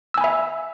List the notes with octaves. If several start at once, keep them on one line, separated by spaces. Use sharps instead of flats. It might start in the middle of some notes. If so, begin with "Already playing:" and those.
E5 G#5 B5 E6